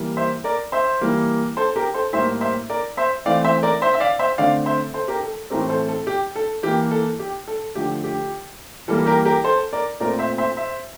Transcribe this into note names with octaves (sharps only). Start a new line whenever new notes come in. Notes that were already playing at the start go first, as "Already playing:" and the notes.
Already playing: E3 G3 A#3
C5 E5
A#4 D5
C5 E5
E3 G3 A#3
A4 C5
G4 A#4
A4 C5
A2 G3 A#3 C5 E5
C5 E5
A#4 D5
C5 E5
E3 A3 C4 D5 F5
C5 E5
A#4 D5
C5 E5
E5
D5 F5
C5 E5
D3 A3 C4 D5 F5
C5 E5
A4 C5
G4 A#4
A4
A2 E3 A3 C4 G4 A#4
A4 C5
A4
G4
A4
E3 A#3 G4
A4
G4
A4
D3 F3 A3 G4
G4
E3 G3 A#3 A4
G4 A#4
G4 A#4
A4 C5
A#4 D5
A#2 A3 C4 A#4 D5
C5 E5
C5 E5
C5 E5